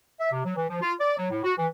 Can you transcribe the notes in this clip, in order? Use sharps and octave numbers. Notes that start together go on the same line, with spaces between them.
E5
C3
F#3
E3
F3
F4
D5
F#3
A2
F#4
E3